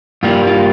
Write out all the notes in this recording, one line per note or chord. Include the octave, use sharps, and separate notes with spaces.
G2 G3 A#3 F4
F4